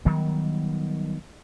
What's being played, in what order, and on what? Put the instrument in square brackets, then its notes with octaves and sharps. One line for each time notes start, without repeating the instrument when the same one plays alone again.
[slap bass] D#3 F#3 G3 B3